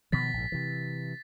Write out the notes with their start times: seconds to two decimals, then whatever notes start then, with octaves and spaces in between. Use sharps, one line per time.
0.12 B2 D#3 F3 A6 B6
0.33 A#1 G#2
0.52 C3 E3